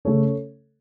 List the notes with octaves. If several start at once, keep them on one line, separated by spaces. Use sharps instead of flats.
C#3 A3 C#4 A4 C#5